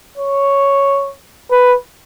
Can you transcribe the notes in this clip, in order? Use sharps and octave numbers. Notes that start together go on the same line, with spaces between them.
C#5
B4